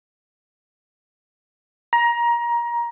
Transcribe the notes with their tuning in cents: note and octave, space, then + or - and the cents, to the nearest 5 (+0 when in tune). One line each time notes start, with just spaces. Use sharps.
A#5 +20